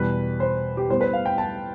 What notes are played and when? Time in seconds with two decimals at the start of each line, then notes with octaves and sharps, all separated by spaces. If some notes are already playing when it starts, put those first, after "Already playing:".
Already playing: E2 B2 G3 B4
0.40 C5
0.77 G4
0.89 A2 G3 B3 C5
1.01 B4
1.13 F5
1.26 G5
1.38 A5